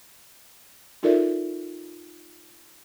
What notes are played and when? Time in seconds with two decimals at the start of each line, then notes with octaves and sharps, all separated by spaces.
1.03 D#4 F4 A4 A#4 D5 E5